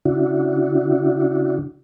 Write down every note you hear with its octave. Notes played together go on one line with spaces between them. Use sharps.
C#3 D4 E4 F#4